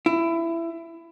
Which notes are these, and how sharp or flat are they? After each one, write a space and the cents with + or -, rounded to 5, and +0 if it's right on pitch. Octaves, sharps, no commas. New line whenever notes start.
E4 +20